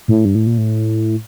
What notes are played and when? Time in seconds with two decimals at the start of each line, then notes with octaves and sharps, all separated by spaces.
0.08 A2
0.25 G2
0.35 A2
0.47 A#2
0.58 A2